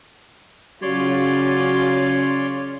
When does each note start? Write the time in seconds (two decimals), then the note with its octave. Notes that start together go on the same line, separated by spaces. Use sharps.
0.82 C#3 F#3 C#4 F4 C#5 D5 C6